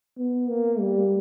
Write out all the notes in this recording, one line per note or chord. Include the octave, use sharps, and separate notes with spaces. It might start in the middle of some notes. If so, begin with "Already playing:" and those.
B3
A#3
G3